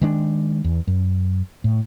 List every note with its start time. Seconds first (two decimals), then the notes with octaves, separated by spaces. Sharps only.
0.02 D#3 G#3 D4
0.64 E2
0.87 F#2
1.64 A2